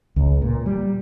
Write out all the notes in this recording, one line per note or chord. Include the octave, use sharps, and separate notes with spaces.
C#2
A#2
G3